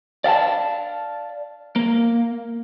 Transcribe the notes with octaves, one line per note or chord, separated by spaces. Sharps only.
D5 F5 F#5 A5
A#3